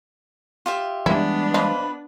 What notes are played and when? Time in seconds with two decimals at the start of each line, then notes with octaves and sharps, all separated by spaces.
0.66 F4 G4 E5
1.06 E3 G3 G#3 B3 D4 E4
1.54 F3 B4 D#5 F5